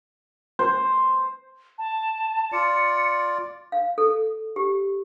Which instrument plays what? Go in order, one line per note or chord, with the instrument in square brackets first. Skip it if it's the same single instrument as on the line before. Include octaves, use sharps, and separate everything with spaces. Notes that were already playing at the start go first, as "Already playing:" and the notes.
[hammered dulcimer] C5
[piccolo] A5
[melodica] F4 D5 [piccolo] C#7
[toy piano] F5
A4
G4